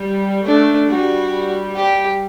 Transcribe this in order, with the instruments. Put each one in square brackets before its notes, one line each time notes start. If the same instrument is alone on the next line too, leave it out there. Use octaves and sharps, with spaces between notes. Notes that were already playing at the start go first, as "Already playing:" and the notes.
Already playing: [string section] G3
[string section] A3 [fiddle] D4
[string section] G3 [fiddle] F#4
[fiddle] G4